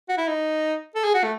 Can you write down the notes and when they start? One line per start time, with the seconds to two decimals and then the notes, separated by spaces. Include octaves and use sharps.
0.09 F#4
0.18 E4
0.28 D#4
0.95 A4
1.04 G#4
1.14 F#4
1.23 A3